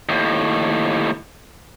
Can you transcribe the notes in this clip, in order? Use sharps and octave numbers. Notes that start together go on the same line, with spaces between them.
D#2 A2